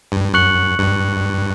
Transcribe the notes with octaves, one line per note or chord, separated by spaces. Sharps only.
G2
F#2 C#6 F#6 C#7 F#7
G2